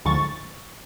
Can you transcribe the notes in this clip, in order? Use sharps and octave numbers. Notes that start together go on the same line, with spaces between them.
D2 G#2 D3 F3 C#6 A6